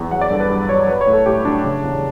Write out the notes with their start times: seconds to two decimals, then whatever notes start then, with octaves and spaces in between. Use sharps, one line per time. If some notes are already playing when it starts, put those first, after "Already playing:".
Already playing: E2
0.11 F#3 F#5
0.21 D5
0.30 G2 A4
0.40 B4
0.50 G2
0.69 F#3 C#5
0.88 F#3 B4
1.01 C#5
1.07 A2
1.13 A4
1.26 A2 G4
1.45 F#3 D4
1.64 C#3
1.84 E2